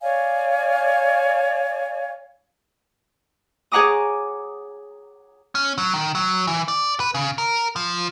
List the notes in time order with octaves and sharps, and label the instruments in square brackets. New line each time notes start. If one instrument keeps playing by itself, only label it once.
[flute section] C#5 D5 F5 G#5
[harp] G#4 C#5 F#5 A#5 D6 D#6
[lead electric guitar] C#4
F#3
D#3
F#3
E3
D5
B4
C#3
A#4
F3